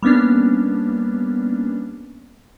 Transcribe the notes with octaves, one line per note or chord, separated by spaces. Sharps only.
G3 A#3 B3 C#4 D4